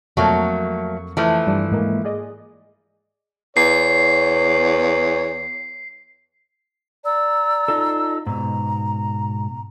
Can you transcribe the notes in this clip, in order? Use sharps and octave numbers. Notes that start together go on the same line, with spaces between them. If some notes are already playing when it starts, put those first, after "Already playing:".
F2 F#3 A3 A#3 C#6
E3 F3 A3
G2 G3 D5
G#2 G#3 A#3
G#4 D5 D#5
E2 C#5 C7
D5 A#5 E6
D#4 F4 A4
G#2 B2 A#5